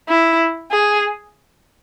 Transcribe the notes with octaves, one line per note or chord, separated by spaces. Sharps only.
E4
G#4